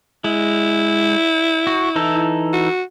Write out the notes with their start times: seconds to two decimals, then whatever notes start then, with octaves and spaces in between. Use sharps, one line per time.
0.24 G#3 E4
1.67 F#4
1.96 E3 D#4 A4
2.53 F#4